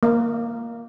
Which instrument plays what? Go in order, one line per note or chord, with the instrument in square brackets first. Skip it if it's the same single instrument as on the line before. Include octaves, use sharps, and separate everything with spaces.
[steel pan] A#3